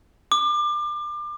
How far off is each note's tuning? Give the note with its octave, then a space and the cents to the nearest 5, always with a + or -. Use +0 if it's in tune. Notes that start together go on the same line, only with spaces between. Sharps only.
D6 +30